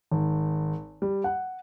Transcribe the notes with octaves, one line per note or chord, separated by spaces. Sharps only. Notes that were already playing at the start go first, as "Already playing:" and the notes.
G#1
G3
F#5